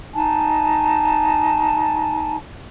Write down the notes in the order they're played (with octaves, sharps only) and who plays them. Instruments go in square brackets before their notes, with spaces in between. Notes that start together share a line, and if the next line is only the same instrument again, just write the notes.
[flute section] D#4 G#5 A5